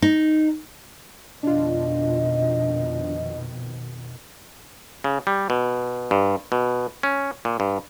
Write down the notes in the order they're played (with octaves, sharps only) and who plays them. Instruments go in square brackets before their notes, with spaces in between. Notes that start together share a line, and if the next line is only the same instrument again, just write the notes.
[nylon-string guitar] D#4
[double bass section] F2 B2 D#3 [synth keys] D4 F4 [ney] D#5
[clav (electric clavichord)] C#3
G3
B2
G2
B2
C#4
A#2
G2